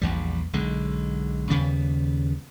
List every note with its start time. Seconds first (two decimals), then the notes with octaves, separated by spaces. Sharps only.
0.02 A#1 E2 G3
0.53 B1 D3 G#3
1.50 D#2 C#3 G3 B3